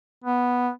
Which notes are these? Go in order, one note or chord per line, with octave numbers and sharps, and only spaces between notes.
B3